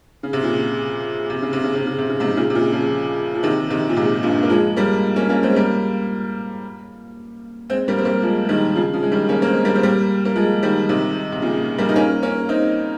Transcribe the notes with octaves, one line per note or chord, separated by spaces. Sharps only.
C#3
C3
A#2 C#3
C3
C#3
C3
C#3
C3
C#3
C3
C#3
G#2 C3
A#2 C#3
C3
A#2 C#3
C#3 F3
F3
C3 D#3
C3 D#3
A#2
G#2 C3
G2 A#2
A#3
F3 G#3
G3 A#3
A#3 C#4
A#3 C#4
G#3 C4
G3 A#3
G#3 C4
G3 A#3
C4
G3 A#3
F3 G#3
G#3
D#3 G3
C#3 F3
C#3 F3
G#3
D#3 G3
A#3 C#4
A#3
G#3 C4
G3 A#3
C4
G3 A#3
A#3
F3 G#3
D#3 G3
C3 D#3
C3
A#2 C#3
G3 A#3
D#4
A#3 C#4
A#3 C#4
C4 D#4